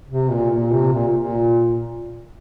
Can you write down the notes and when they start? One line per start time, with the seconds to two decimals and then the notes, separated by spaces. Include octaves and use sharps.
0.10 C3
0.31 A#2
0.51 A#2
0.72 C3
0.93 A#2
1.16 A#2